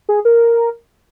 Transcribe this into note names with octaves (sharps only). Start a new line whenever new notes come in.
G#4
A#4